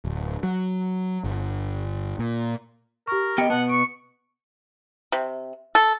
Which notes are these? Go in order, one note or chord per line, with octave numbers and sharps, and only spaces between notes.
D1
F#3
G1
A#2
G4 A#4 C#6
B3 G4 D#5 G5 C#7
B2 B3 F#5 A5
C#6 D7
C3
A4